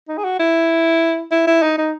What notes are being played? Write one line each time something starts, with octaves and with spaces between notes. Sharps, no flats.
D#4
G#4
F#4
E4
E4
E4
D#4
D#4